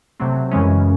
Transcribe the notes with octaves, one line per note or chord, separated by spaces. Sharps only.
C3 F#3 A3 C4
F#2 C#3 E3 G#3 C#4